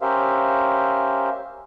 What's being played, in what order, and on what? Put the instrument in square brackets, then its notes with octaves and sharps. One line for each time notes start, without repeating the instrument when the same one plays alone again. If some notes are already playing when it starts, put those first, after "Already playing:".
[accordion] C#4 G4 A#4 C5 E5 F5